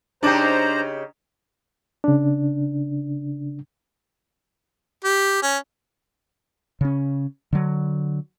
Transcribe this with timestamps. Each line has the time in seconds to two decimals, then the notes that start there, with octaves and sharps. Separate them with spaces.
0.23 C#3 D4 D#4 G4 C5 A#5 D6
2.04 C#3 D4
5.04 G4
5.42 C#4
6.81 C#3 C#4
7.53 D3 F#3